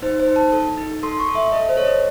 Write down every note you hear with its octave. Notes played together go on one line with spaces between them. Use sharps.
D#4 C5
C5
D#4
A5
A4
D#4
A4 C6
C#6
A4
E5
A4 D#5
C5
A4 C#5
D#5